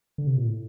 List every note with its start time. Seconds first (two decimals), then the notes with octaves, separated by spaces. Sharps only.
0.18 D3
0.27 C3
0.37 A#2
0.47 A2